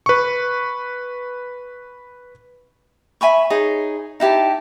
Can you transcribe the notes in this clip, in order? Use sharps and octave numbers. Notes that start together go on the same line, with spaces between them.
B4 C#6
E5 G#5 B5 C#6
D#4 G#4 C#5
D#4 E4 G4 A5